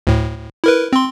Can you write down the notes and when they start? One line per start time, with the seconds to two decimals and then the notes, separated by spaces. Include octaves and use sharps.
0.07 D2 A2
0.64 E4 A#4 B4
0.93 C4 C6